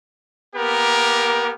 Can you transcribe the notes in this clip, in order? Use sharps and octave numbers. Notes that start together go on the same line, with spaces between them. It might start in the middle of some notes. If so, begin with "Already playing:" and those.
A#3 B3 G4 A#4